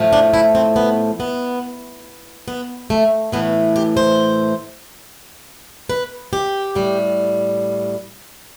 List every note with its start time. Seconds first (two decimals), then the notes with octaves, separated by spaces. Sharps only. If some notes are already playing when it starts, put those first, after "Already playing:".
Already playing: A2 F3 A3
0.13 D4
0.34 E4
0.55 C4
0.76 B3
1.20 B3
2.48 B3
2.90 A3
3.32 A2 E3 A3 B3
3.76 G4
3.97 C5
5.89 B4
6.33 G4
6.75 A2 G3